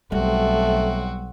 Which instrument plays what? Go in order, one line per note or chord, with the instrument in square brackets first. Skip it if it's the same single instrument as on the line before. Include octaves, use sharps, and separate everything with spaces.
[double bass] B1 [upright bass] G3 [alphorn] A3 [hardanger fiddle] C4 F#4